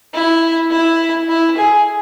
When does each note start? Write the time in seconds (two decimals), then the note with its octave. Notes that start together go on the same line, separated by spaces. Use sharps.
0.14 E4
0.71 E4
1.29 E4
1.58 G#4